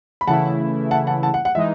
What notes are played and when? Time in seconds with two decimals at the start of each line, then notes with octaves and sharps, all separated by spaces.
0.21 B5
0.27 C#3 E3 A3 E4 F#5 A5
0.91 F#5 A5
1.07 F#5 A5
1.23 F#5 A5
1.34 F#5
1.45 F#5
1.55 E3 G#3 D#4 E5